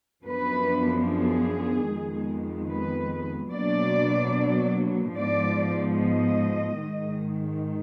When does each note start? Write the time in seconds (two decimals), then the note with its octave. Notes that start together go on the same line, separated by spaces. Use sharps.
0.24 F#2 F3 B3 D4 B4
1.06 G#4
1.88 F2 D#3 G#3 B3
2.70 B4
3.52 B2 F#3 A#3 D4 D5
5.16 G#2 F3 B3 D5
5.99 D#5
6.80 G#2 D#3 G#3